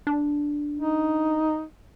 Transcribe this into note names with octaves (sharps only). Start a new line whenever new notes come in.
D4
D#4